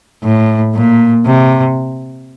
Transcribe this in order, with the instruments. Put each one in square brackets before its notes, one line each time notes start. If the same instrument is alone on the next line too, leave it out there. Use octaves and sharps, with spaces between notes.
[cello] A2
A#2
C3